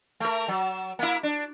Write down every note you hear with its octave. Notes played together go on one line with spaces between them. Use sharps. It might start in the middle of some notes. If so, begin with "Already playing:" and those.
A3 A#4
F#3
A#3 E4
D4